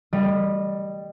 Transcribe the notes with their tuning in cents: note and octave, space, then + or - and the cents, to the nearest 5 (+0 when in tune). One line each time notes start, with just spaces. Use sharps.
G3 +0 D#5 -20